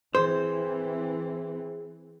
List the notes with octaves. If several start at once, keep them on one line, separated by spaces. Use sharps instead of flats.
E3 C4 G#4 C5